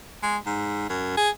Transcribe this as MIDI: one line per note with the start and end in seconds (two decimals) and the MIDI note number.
0.23 0.37 56
0.46 0.88 44
0.90 1.13 42
1.17 1.30 68